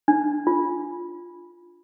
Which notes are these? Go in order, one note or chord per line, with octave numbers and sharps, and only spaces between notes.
D4
F4